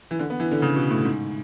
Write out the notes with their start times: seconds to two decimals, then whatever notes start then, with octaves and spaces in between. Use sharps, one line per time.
0.11 E3
0.19 D3
0.30 B3
0.40 E3
0.51 D3
0.62 C#3
0.76 B2
0.90 A2
1.05 G#2